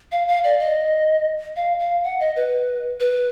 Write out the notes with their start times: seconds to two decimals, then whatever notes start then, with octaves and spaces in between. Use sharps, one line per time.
0.12 F5
0.28 F5
0.44 D5
0.60 D#5
1.56 F5
1.80 F5
2.04 F#5
2.20 D#5
2.36 B4
3.00 B4